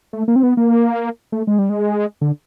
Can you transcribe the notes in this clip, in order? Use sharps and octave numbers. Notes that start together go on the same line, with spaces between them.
A3
A#3
C4
B3
A#3
A3
G#3
G3
G#3
D3